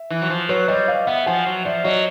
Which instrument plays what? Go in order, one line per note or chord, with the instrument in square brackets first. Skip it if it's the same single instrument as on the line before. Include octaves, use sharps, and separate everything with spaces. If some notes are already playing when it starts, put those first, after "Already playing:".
Already playing: [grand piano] E5
[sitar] E3
F#3
F3
[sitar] F#3 [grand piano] B4 C#5
[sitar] G3 [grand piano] C#5 D#5
[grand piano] D#5 F5
[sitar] B3 [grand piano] E5 F#5
[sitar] F3 [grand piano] F#5 G#5
[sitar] F#3
[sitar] F3 [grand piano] D5 E5
[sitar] F#3 [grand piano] C#5 D#5